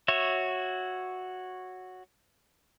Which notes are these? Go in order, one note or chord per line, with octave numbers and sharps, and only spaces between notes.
F#4 C#5 E5